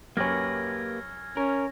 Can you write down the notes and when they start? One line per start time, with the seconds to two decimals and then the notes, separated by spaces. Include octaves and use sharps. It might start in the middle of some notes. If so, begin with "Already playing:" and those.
0.17 F#2 A#3 C#4 G4 B4 F6 G#6 A#6
1.37 C#4 A#4